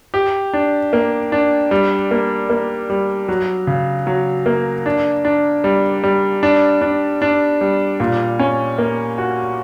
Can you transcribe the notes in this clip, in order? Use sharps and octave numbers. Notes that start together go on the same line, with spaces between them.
G4
D4
A#3
D4
G3
A#3
A#3
G3
F#3
C#3
F#3
A#3
D4
D4
G3
G3
D4
D4
D4
G3
A#2
C#4
A#3
F#4